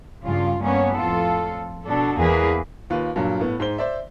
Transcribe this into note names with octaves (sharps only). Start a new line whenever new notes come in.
G2 C#3 F4
G2 A#3 B3 C#4 C#5
F2 A2 F4 A4
B2 D4 A4
E2 A#3 G#4 B4
D#2 F4 B4
G2 A#2 F#3
A2 B3
G#2 C5 G7
C5 D5 E5